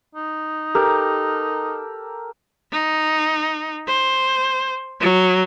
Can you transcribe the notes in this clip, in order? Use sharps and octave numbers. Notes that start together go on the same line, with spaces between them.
D#4
G4 A4 A#4
D#4
C5
F#3